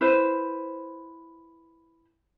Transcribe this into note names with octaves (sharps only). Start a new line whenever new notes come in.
E4 B4 C5